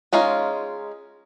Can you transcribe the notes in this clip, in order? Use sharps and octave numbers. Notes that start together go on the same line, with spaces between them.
G#3 C#4 D#4 F4